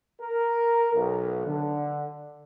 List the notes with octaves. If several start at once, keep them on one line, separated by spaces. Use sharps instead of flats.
A#4
B1
D3